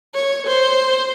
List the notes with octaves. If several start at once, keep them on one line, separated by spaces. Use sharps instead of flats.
C#5
C5